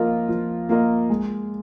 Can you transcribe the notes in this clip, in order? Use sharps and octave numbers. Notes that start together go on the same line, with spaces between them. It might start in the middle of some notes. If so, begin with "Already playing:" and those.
Already playing: F3 A#3 F4 A#4 D#5
F3
A#3 F4 A#4 D#5
G#3